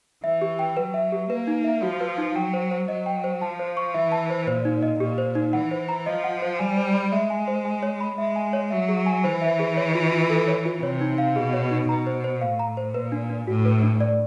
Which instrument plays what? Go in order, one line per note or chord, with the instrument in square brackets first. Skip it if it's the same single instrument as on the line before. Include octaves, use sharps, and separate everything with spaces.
[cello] E3 [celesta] E5
[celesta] G4
G5
[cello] F#3 [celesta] B4
[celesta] E5
G4
[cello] A#3 [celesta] B4
[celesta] D#4
E5
[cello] F3 [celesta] F#4
[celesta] B4
D#4
[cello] F#3 [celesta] G5
[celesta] C5
C5
[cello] F#3 [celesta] D#5
[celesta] G5
C5
[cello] F3 [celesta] A5
[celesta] C5
C#6
[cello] E3 [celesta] E5
[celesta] A5
C5
[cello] A#2 [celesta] C5
[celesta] D#4
D#5
[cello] A#2 [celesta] G4
[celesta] C5
D#4
[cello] E3 [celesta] F#5
[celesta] C5
A#5
[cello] F3 [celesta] D#5
[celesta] F#5
C5
[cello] G3 [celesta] G#5
[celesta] C5
B5
[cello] G#3 [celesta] E5
[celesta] G#5
C5
G#5
C#5
B5
[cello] G#3 [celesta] E5
[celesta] G#5
C#5
[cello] F#3 [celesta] E5
[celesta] G#4
G#5
[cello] E3 [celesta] C5
[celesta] E5
G#4
C#5
F4
F4
A4
C#5
F4
[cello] C3 [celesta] C#5
[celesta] D#4
F5
[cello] B2 [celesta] G#4
[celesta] C#5
D#4
[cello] B2 [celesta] A#5
[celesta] C5
C5
[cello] A2 [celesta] F5
[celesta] A#5
C5
[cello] A#2 [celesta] B4
[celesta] D4
D4
[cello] A2 [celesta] F#4
[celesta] B4
D4
D5